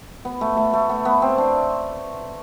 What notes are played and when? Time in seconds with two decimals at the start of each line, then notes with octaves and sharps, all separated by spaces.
0.25 B3
0.41 A3
0.57 A3
0.73 A3
0.89 B3
1.05 B3
1.22 C4
1.38 D4